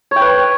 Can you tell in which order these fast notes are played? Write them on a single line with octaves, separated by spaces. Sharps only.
C#5 G5 B4